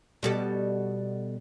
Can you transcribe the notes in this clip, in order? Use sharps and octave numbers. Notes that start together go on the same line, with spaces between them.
B2 G3 A4